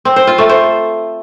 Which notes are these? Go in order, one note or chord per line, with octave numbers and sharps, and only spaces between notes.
C4
C5
F4
A3
C5